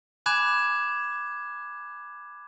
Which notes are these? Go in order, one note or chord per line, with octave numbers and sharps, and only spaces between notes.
G#5 B5 D6 F#6 G#6 E7